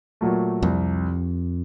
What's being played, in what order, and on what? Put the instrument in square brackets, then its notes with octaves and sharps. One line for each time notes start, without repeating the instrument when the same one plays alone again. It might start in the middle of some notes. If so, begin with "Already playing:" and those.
[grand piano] A#2 F#3 A3
[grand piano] C2 [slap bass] F2